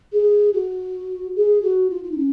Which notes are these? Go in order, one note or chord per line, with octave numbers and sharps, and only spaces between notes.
G#4
F#4
G#4
F#4
F4
F4
D#4
C#4